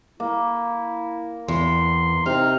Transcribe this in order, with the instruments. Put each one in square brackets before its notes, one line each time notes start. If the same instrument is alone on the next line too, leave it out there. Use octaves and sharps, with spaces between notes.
[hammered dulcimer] A#3 [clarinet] E4
[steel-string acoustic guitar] E2 [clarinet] C6
[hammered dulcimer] C3 [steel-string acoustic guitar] D#4 [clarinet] F6